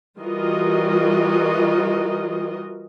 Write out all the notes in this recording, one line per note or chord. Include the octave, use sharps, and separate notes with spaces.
E3 G3 F4 F#4 A#4 D#5